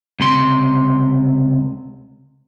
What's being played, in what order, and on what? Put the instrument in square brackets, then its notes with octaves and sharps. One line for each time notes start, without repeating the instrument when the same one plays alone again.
[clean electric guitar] C#2 C3 C6